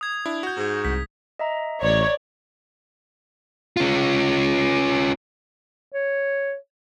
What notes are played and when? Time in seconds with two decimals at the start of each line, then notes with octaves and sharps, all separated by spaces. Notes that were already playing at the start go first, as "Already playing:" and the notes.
0.01 D#6 G#6
0.26 D4 E4
0.43 F#4 G6
0.57 G#2
0.84 C2 B6
1.39 D#5 E5 A#5
1.82 A1 C#5 D5
3.77 C#4 F4
5.93 C#5